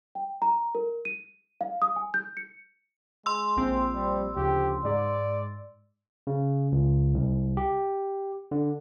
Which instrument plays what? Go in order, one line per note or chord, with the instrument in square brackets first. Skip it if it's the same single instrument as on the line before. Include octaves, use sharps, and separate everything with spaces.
[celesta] G5
A#5
A#4
D#7
F5
D#6
G#5
G6
C#7
[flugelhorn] G#3 [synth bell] C6 E6
[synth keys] A#1 C4
[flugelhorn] G3
[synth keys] D2 C#3 F3 [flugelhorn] G4
[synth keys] G#2 [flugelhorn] D5
[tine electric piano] C#3
C#2
C2
G4
D3